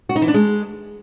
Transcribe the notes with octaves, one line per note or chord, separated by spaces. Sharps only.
F#4
D#4
E3
D4
G#3